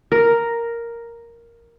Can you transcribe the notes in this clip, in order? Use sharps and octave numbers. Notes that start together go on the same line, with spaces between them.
A#4